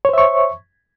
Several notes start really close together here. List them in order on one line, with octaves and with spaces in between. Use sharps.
C#5 C5 E5 C#6